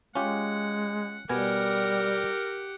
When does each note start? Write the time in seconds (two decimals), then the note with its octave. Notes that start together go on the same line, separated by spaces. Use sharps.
0.15 G#3 C#4 F4 G4 F#5
1.29 B2 G3 B3 G4 A#4 F#5 G#5